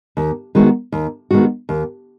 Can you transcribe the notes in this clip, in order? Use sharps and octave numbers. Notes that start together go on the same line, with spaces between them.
D#2
D#3 G#3 B3 F#4
D#2
D#3 G#3 B3 F#4
D#2